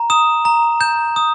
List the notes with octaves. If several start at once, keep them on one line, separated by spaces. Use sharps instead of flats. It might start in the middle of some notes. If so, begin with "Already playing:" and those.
Already playing: A#5
D#6 E7
A#5
G6 E7
D#6